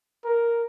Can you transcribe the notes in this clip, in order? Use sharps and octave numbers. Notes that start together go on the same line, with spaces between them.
A#4